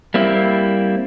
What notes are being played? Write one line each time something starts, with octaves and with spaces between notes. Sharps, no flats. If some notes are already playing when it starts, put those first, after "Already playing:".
G3 A#3 C4 E4